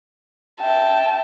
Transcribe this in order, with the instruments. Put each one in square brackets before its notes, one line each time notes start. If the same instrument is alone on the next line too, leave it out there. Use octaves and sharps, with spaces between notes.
[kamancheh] E5 G5 [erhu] A5